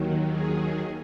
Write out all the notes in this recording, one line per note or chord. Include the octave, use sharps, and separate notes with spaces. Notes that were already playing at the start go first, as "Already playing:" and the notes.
Already playing: D#2 D#3 F#3
G#4